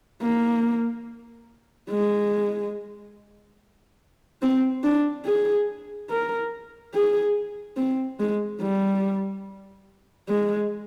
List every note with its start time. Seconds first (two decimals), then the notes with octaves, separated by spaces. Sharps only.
0.22 A#3
1.90 G#3
4.42 C4
4.84 D4
5.26 G#4
6.10 A#4
6.94 G#4
7.77 C4
8.20 G#3
8.61 G3
10.29 G#3